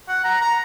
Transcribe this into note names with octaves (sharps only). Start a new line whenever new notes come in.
F#5
A#5
A#5